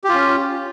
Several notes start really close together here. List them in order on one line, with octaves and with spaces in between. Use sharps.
G4 F4 C#4